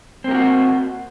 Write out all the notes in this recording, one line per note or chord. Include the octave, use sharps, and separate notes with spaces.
A#3 C4 F#4 G4